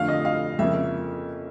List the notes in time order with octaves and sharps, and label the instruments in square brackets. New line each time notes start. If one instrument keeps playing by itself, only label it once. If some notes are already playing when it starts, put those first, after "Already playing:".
Already playing: [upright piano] F2 D3 F3 A3 F5
D#5
F5
F2 C#3 F3 A#3 C#4 E5